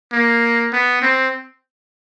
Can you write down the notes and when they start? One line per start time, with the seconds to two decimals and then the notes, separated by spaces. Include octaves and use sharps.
0.13 A#3
0.73 B3
1.02 C4